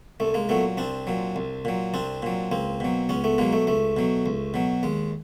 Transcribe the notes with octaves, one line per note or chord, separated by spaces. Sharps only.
C2 A3
G#3 A#3
A#2 F#3 A3 B3
C2 C4 D4
A#2 F#3
C2
A#2 F#3
C2 C4 D4
A#2 F#3
C#2 A#3 C4
B2 F#3
C#2 B3 C#4
A3 B3
B2 F#3 G#3 A#3
A3
C#2 A3
B2 F#3
C#2
B2 F#3
D#2 G#3